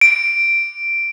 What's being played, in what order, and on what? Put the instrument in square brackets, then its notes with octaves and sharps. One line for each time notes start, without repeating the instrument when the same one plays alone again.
[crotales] D7